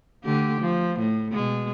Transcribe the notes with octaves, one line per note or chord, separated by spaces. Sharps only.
D3 A3 G4
F3
A2
B2 G#3